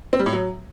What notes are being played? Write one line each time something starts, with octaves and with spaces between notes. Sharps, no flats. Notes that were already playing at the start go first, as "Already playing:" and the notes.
C4
G3
A2
F#3